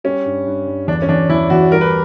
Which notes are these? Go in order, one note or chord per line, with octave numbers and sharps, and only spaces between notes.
G3 C#4
G2
G2
G2
E2 D4
C#4
E2 D4
E2 E4
E2 F#4
G3 A#4
B4